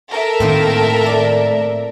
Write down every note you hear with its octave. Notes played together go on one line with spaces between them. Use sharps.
A4 A#4 E5
A2 D#3 A#3 C4
D5